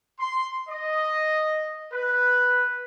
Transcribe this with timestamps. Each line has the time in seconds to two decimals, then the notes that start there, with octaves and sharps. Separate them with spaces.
0.19 C6
0.69 D#5
1.93 B4